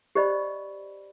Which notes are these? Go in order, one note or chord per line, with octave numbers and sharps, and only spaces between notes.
G4 C5 D5 D#5 B5